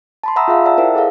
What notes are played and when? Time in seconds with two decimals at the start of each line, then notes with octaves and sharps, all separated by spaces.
0.24 A5 B5 C6
0.36 E5 F#5 A#5 B5 D#6 E6
0.48 F4 G#4 E5 F5
0.65 D5 E5 F#5 A5 A#5 E6
0.78 E4 A#4 C5 D#5 G5
0.95 G#4 A4 F5